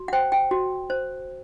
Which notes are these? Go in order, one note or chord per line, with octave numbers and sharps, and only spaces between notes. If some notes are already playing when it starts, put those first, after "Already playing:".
Already playing: F#4
F#5
C5 G5
G5
F#4
C5